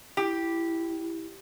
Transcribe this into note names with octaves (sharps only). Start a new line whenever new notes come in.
E4 G4